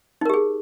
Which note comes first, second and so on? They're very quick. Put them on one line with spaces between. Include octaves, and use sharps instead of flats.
D#4 A#4 G4 G#4